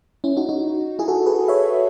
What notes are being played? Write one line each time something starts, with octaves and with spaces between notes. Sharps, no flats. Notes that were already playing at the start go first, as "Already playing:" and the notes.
C#4 E4
D#4 F#4
D#4 F#4
E4 G#4
F#4 A4
G#4 B4
C#5 E5